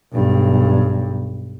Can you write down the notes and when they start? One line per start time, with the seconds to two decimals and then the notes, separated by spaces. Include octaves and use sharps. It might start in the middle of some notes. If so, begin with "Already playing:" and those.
0.13 B1 G2